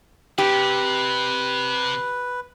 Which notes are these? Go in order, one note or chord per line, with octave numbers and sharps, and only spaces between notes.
C3 G4 B4